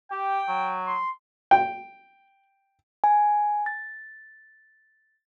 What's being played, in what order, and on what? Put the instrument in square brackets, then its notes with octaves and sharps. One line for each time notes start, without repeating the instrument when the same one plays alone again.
[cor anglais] G4 [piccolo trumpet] G5
[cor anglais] F#3
[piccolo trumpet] C6
[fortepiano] G5
[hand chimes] G#5
A6